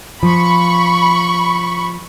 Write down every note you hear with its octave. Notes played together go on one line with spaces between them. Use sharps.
F3 B5 C#6